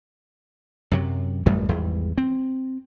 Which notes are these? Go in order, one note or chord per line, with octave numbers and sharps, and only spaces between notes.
F#2 C3 F#3
A1 F#2 G3 A3
G#1 E2 G3
C4